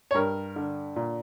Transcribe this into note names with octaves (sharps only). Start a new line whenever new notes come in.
C#5
G2 A#4
D3
A#2